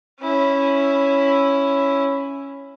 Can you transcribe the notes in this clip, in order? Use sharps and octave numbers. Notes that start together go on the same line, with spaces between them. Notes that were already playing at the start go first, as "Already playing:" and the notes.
C#4 E4